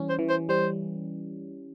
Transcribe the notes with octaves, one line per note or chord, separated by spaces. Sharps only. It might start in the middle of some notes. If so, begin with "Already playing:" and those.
Already playing: E3 G3 C#4
C5
E3
C5
G3 C5